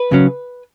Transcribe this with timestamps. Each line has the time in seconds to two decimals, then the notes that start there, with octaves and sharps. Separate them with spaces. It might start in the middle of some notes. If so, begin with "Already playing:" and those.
Already playing: B4
0.12 C#3 F#3 C#4